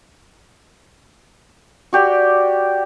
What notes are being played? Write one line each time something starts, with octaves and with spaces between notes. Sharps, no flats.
F#4 G4 D5